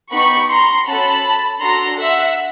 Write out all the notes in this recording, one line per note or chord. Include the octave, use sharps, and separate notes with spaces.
B3 D#4 G4 B5 C#6
A#5 C6
C#4 F#4 A4 A5 B5
D4 F#4 A4 A#5 C6
E5 F#5